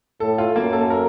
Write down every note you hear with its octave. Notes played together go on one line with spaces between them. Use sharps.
A2 A4
F4
F#2 A#3
A4
A#4